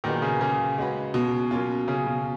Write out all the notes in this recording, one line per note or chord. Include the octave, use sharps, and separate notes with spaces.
A#2 D#3 F#3 B3 D#4 G#4
C#3
C#3
G#3 C#4 F#4 B4
B2
F#3 A#3 C#4 F4
C#3
B2